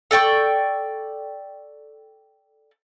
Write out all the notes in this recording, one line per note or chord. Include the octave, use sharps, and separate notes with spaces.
A4 D5 G5 C#6